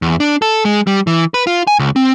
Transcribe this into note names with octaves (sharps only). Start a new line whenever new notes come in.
E2
D4
A4
G#3
G3
E3
B4
F4
G#5
C#2
C4